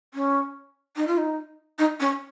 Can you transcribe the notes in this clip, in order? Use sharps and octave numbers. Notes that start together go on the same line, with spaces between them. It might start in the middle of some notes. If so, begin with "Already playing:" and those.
C#4
D#4
F4
D#4
D#4
C#4